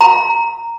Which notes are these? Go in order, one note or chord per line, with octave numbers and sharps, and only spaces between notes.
A#5